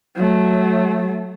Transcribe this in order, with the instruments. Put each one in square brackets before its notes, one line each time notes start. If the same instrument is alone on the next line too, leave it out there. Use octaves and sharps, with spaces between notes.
[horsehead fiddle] F#3 A3